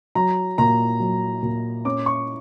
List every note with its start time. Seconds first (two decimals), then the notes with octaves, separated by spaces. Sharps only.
0.15 F#3 A#5
0.58 A#2 A#5
1.00 F#3
1.43 A#2
1.85 C#4 D6
2.06 C#6